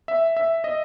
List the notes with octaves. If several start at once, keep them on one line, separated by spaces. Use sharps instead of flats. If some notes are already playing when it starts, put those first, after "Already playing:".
E5
E5
D#5